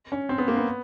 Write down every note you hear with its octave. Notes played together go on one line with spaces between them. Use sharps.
C#4
C4
B3
A#3
B3